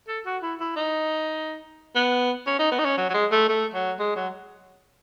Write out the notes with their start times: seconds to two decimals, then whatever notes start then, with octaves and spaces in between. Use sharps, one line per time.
0.08 A4
0.26 F#4
0.43 E4
0.60 E4
0.76 D#4
1.96 B3
2.47 C#4
2.59 D#4
2.72 B3
2.79 D#4
2.85 C#4
2.97 F#3
3.09 F#3
3.14 G#3
3.32 A3
3.48 A3
3.74 F#3
3.99 G#3
4.16 F#3